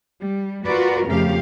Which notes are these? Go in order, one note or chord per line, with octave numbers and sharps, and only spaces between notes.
G3
F4 F#4 A#4 B4 D5
F2 C#3 F3 A3 G4 F5